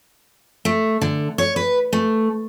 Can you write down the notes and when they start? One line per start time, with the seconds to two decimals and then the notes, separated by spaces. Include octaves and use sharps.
0.65 A3
1.01 D3
1.38 C#5
1.56 B4
1.93 A3